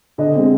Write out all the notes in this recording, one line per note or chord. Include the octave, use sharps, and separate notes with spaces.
D3 D#5
G#3 C4